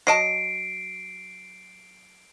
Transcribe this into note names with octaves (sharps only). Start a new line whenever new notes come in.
F#3 D#5 A5 C7 D7